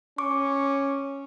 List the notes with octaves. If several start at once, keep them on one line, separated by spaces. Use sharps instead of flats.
C#4 C#6 D6